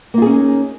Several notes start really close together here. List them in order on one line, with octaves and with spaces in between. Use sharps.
A#3 F4 G#4 C#4 D#4